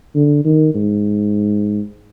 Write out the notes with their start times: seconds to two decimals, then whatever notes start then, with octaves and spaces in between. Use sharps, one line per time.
0.15 D3
0.45 D#3
0.75 G#2